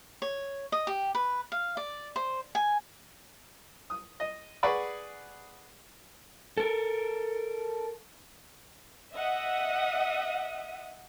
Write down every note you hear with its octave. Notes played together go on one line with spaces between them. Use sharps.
C#5
D#5
G4
B4
F5
D5
C5
G#5
D#6
D#5
G#4 B4 D5 F#5 B5 C#6
A4 A#4
D#5 E5 F#5 D#6